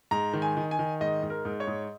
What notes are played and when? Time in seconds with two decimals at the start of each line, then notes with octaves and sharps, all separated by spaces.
0.11 G#2 A#5
0.33 D#3
0.42 G#5
0.57 D#3
0.71 G#5
0.79 D#3
1.01 G#2 D#5
1.23 G#2
1.30 A#4
1.45 G#2
1.60 C#5
1.67 G#2